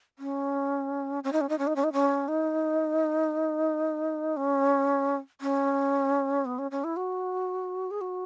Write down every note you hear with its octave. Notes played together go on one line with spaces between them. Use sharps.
C#4
C#4
D#4
C#4
D#4
C#4
D#4
C#4
D#4
C#4
D#4
C#4
C#4
B3
C#4
C#4
E4
F#4
G#4
F#4